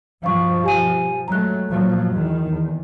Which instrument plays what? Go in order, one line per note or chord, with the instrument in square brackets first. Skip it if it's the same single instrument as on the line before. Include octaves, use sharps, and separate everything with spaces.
[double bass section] G2 B2 F3 [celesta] F5 C#6
[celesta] G4 G#5 D#7
[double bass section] F#3 G#3 A3 [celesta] A#5 F#6
[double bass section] A#2 F3 F#3
E2 D#3
E2